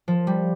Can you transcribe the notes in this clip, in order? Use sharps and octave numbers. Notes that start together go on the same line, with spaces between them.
F3
G3